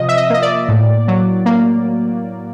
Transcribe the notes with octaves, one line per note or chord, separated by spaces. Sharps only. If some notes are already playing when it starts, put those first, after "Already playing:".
Already playing: C3 F3 D#5
E5
D#5
A#3 D#5
D5
A2
F#3
A#3